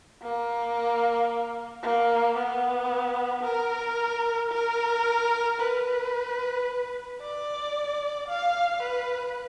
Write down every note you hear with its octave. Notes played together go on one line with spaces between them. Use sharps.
A#3
A#3
B3
A#4
A#4
B4
D5
F5
B4